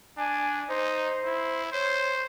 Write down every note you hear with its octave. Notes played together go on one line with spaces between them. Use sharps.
D4 G#5
D#4 C5
E4
C5 C#5